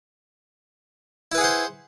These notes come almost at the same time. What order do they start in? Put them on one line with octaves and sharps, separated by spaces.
E4 B4 G#4 F#5 C5